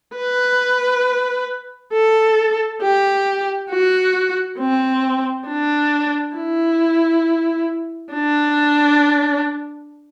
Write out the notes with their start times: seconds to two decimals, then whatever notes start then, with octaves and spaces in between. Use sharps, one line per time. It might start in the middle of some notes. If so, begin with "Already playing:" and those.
0.16 B4
1.93 A4
2.82 G4
3.70 F#4
4.59 C4
5.48 D4
6.36 E4
8.13 D4